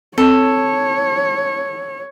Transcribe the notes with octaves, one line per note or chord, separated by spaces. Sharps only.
C4 A4 C#5